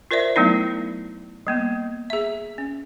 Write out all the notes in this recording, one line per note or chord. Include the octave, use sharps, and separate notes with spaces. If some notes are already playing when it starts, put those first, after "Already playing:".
F4 A#4 C5 D5 E5
F#3 A3 B3 D#4 E4
G3 A#3 B3
G#4 E5
C#4